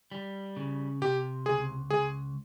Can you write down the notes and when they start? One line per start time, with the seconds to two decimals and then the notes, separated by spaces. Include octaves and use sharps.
0.12 G3
0.57 C#3
1.02 C3 G4
1.46 C#2 G#4
1.90 C#2 G#4